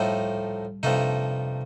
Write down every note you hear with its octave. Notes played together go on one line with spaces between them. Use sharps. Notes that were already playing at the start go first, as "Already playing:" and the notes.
Already playing: A2 F3 G3 A3 D#4
G2 C3 F3 A3 D#4